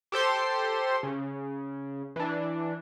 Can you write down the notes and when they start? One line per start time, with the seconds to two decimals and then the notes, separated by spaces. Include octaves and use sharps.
0.12 G4 A4 C5 C6
1.03 C#3
2.16 E3 D4